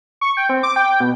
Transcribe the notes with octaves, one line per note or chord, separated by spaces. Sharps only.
C#6
G5
C4
D6
G5
B2